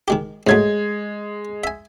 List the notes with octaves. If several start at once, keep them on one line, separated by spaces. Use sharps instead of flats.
D#3 G#3 G4
G#2 F#3 G#3 A3 G#6
E5 G#5